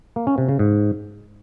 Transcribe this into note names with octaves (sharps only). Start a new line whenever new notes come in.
A#3
C#4
C3
C#3
G#2